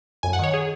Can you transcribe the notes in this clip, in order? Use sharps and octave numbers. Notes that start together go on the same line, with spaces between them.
F#2 G#5
F#5
D#3 C#5
G#4